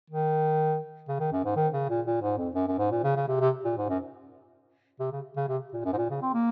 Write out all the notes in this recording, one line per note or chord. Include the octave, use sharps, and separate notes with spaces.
D#3
C#3
D#3
F#2
G#2
D#3
C#3
A#2
A#2
G#2
F2
F#2
F#2
G#2
A#2
C#3
C#3
C3
C3
A#2
G#2
F#2
C3
C#3
C#3
C3
A#2
F#2
G#2
A#2
C#3
C4
A#3